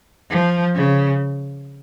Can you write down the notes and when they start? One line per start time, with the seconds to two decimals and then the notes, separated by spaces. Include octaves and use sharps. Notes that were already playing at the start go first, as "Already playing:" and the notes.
0.30 F3
0.75 C#3